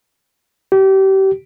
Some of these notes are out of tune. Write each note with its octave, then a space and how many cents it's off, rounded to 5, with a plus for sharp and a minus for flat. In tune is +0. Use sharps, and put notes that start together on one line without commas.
G4 -30